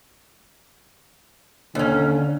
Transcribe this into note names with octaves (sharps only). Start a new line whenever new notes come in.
D#2 D3 C#4